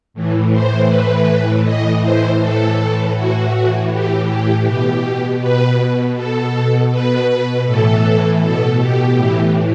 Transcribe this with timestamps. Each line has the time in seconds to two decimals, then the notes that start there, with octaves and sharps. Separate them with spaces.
0.14 A2 E3
0.52 C5
0.89 A2 E3 B4
1.64 A2 E3 D#5
2.02 C5
2.39 A2 E3 A4
3.15 A2 E3 F#4
3.90 A2 E3 G4
4.28 G4
4.65 B2 G4
5.41 B2 B4
6.15 B2 A4
6.91 B2 B4
7.66 A2 E3 A4
8.41 B2 A4
8.80 G4
9.16 A2 E3